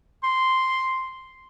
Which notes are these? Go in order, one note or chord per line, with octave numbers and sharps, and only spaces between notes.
C6